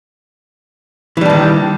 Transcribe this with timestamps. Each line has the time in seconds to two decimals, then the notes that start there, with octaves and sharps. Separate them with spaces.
1.17 E3
1.21 G3
1.25 D4
1.30 D#3